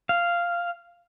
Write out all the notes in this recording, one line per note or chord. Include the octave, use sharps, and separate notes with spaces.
F5